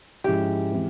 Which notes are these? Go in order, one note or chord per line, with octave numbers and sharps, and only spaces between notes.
G#2 F3 G#3 C#4 E4 G4
E3 G#3 C4